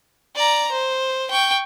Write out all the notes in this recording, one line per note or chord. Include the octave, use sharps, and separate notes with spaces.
D5 A#5
C5
G5 C#6